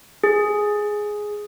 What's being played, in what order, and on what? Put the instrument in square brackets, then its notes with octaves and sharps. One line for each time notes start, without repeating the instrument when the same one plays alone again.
[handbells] G#4